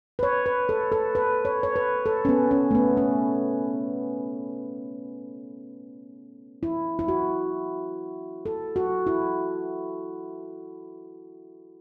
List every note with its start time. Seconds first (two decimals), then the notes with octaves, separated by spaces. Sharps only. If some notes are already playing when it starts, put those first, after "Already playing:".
0.19 B4
0.23 C#5
0.46 B4
0.69 A4
0.92 A4
1.15 B4
1.45 C#5
1.63 C#5
1.76 B4
2.06 A4
2.25 C#4
2.29 B3
2.51 C#4
2.71 A3
2.75 B3
2.97 C#4
6.63 E4
6.99 E4
7.08 F#4
8.46 A4
8.76 F#4
9.07 E4